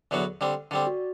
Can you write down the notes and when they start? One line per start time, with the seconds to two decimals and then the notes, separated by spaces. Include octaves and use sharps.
0.11 E2 D3 F#3 B3 F#4
0.41 D3 G3 C4
0.71 D3 G3 C4 D5
0.87 F#4